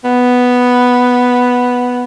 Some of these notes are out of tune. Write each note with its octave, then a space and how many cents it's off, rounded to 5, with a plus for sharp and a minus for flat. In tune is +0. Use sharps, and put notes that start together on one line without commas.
B3 +0